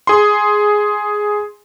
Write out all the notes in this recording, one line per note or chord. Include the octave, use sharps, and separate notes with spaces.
G#4 C6